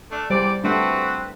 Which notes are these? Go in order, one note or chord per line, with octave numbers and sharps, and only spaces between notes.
A3 D4
E2 G3 C5 D5
A3 C4 D4 F#4 B4